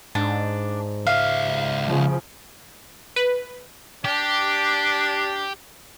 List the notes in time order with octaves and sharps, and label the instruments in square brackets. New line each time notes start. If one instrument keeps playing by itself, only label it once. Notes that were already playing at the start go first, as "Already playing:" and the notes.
[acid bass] G#2 [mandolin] D4
[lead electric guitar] C#2 E5 [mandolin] F5
[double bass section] C#3 F3
[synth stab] B4
[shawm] D4 [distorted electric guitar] G4